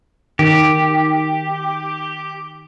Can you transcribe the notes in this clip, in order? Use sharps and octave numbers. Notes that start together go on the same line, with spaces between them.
D#3 G4